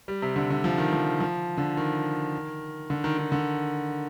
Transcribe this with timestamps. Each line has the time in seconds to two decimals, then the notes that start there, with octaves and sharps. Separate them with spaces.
0.08 G3
0.22 C3
0.36 D3
0.50 D3
0.64 F3
0.78 D#3
0.93 F3
1.20 F3
1.57 D3
1.77 D#3
2.90 D3
3.04 D#3
3.18 D#3
3.32 D3